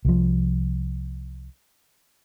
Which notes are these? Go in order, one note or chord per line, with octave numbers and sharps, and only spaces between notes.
C2 F3